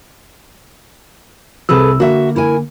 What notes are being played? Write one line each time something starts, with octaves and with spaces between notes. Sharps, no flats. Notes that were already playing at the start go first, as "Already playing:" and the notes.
C2 C3 G#4 A4 B4 E6
D3 A#3 F#4 E5
E4 A#4 G#5